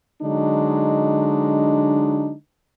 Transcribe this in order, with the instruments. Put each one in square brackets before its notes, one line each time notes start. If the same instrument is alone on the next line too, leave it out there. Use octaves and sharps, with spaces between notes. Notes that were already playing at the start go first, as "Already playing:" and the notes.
[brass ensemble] D3 F#3 G#3 D4 D#4